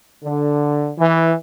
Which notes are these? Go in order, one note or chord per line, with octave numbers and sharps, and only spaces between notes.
D3
E3